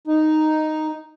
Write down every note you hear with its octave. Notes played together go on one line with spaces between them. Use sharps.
D#4